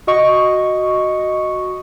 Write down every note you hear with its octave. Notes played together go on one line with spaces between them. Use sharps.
F#4 D#5 C#6